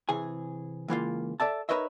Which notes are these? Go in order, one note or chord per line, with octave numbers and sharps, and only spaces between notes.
C3 E3 G#4 G#5
C#2 E3 A#3 F4
A4 D5 E5 A5
D#4 A#4 B4 C#5 D#5 E5